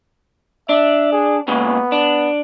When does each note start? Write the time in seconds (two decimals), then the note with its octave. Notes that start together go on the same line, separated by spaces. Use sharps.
0.69 D4 E5
1.12 G#4
1.48 A#2 C#3 G#3 B3
1.92 D4